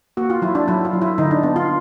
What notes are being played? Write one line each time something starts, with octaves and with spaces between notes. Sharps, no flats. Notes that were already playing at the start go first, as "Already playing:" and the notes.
A#3 F#4
F4
F#3 E4
D4
F#3 E4
F4
F#3
E4
D3 D#4
D4
B3 D4
F4